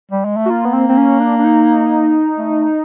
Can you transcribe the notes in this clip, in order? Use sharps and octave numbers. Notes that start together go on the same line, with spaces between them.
G3
G#3
A3
F#4
A#3 F4
B3
C4
C4
C#4
D4
D4
D#4
A3